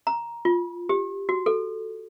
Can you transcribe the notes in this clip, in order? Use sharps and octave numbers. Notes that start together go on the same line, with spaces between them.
A#5
F4
G4
F#4
A4